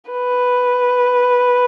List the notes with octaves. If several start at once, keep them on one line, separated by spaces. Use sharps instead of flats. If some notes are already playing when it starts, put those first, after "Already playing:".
B4